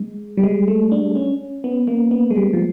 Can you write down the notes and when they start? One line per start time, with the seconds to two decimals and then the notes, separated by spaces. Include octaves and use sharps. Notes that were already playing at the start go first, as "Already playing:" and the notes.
Already playing: G#3
0.37 G3
0.43 G#3
0.68 A3
0.92 D4
1.15 C#4
1.64 B3
1.88 A#3
2.11 B3
2.31 G#3
2.36 G3
2.53 F3